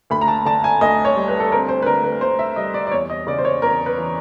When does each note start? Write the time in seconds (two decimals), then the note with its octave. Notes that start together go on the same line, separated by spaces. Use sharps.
0.10 D2 B5
0.21 A#5
0.28 A5
0.45 D3 A5
0.64 G#5
0.81 D2 D#5
1.05 C#5
1.16 G3
1.28 B4
1.40 A4
1.52 C4 A#4
1.69 C5
1.82 B4
1.86 D3 A#4
2.04 B4
2.21 D2 C5
2.39 E5
2.56 G3 D#5
2.74 D5
2.87 D5
2.91 E2 C#5
3.10 D#5
3.27 C#3 D5
3.38 C5
3.45 C#5
3.62 E2 A#4
3.86 B4
3.98 E3